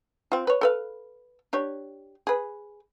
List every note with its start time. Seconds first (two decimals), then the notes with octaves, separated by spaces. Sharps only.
0.32 C4 F4
0.47 B4 C#5
0.61 A4 B4 F5
1.53 D4 G4 C#5
2.27 G#4 B4